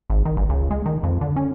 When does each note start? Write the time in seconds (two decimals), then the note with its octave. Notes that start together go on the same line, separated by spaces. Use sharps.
0.10 G#1
0.25 D#3
0.37 G1
0.49 C#2
0.71 G#3
0.86 D#3
1.03 F2
1.21 D3
1.36 C#4